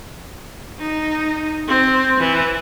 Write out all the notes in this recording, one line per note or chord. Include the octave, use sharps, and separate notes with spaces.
D#4
C4
E3